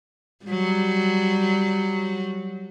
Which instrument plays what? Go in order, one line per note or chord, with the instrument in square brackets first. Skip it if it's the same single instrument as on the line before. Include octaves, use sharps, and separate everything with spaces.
[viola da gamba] F#3 G3